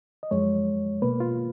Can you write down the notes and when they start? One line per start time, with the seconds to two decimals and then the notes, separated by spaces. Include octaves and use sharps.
0.23 D#5
0.31 F#2 F3 G#3 C#5
1.02 B2 A#3 B4
1.20 F4